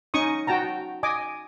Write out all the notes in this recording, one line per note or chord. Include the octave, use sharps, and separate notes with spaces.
C#4 D#4 C#6 D#6
F#4 G5 A5 A#5
D#5 G#5 D6